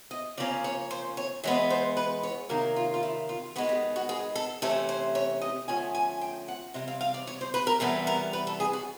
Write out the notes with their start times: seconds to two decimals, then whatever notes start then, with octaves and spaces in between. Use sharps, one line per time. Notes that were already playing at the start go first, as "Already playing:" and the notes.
0.11 D#5
0.37 C#3 F3 A#3 C#4 D5
0.64 C#5
0.91 C5
1.17 C#5
1.44 E3 G#3 B3 C#5
1.70 C5
1.97 B4
2.23 C#5
2.49 C3 D#3 F#3 A#3 A#4
2.76 F4
2.94 F4
3.03 E4
3.29 F4
3.56 D#3 G#3 B3 F#4
3.69 G4
3.96 F#4
4.09 G#4
4.36 A4
4.62 C3 E3 A3 C#4 A4
4.89 C5
5.15 C#5
5.42 D#5
5.68 D3 F3 A3 C#4 G#5
5.95 G#5
6.21 G5
6.48 F#5
6.74 C3 E3 G3 C4
6.88 F5
7.01 F5
7.14 D5
7.27 C#5
7.41 C5
7.54 B4
7.67 A#4
7.80 C3 E3 G3 B3 A4
8.07 A#4
8.33 B4
8.47 A4
8.60 G#4
8.73 F#4